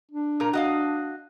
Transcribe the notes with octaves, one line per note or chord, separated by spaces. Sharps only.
D4
A#2 A#4
F#4 D#5 F5